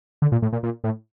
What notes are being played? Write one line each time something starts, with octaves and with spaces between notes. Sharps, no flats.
D3
A#2
A2
A#2
A#2
A2